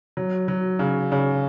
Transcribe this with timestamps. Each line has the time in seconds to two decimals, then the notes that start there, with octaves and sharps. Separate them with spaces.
0.17 F#3
0.48 F#3
0.79 C#3
1.12 C#3